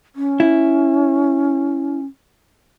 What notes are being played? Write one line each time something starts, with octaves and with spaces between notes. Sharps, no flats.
C#4
E4